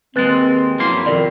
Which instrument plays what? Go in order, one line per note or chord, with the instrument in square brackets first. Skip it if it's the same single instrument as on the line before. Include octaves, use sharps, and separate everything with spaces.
[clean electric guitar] D#2 G#3 [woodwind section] C4 [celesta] B4 F#6 A6
[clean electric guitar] F#2 A#3 C6 [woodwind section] F3 E4
[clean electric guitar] F2 [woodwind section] C3 D#3 [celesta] A#4 D5